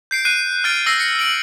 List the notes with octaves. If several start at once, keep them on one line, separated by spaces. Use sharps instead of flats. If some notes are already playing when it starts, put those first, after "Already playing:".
G6 C7 D7
F#6 C7 D#7
F6 F#6 A6 D7
E6 A#6 C7
A#6 C#7
D7 F#7